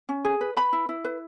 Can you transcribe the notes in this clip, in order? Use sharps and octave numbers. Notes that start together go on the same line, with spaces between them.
C#4
G#4
B4
B4 B5
E4
E4
B4